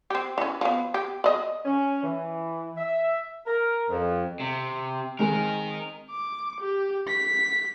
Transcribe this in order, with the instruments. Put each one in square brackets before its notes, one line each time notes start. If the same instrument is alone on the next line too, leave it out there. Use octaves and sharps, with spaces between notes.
[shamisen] C4 G4
E3 C#4
F3 B3
G4
D5 D#5
[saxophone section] C#4
E3
E5
A#4
F2
[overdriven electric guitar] C3
[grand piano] D#3 G#3 C4 [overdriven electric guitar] D#4 A#4
[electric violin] D6
G4
B6